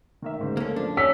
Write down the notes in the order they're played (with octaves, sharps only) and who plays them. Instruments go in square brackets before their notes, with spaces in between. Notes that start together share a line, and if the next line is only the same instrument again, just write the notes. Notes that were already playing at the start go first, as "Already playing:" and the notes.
[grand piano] D#3 A#3 E5
D2 G#2 C#3
[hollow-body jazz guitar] A#3 C#4 [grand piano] A4
[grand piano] F3 [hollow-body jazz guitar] D4
[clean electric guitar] C#4 [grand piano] D5 [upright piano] E6 B6